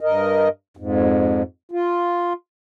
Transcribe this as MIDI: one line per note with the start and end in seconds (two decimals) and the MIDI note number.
0.01 0.49 43
0.01 0.49 70
0.01 0.49 75
0.77 1.42 41
0.77 1.42 44
1.71 2.33 65